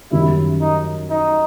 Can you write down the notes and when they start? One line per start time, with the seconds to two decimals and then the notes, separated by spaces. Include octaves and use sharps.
0.11 F#2 D#3 G3 E4
0.60 D#4
1.10 D#4